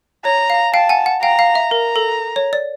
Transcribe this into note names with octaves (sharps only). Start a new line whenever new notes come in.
C#5 A#5
F5
F5 G5 A5
F#5 G#5
F#5
F5 G5 A#5
F5
E5
A#4 A#5
A4
C#5
D5